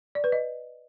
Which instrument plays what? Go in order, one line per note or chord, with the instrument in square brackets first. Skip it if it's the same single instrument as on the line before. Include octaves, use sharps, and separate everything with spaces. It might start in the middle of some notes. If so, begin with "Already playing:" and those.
[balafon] D5
B4
D#5